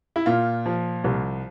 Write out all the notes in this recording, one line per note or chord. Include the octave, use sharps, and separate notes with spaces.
E4
A#2 F4
F3
C2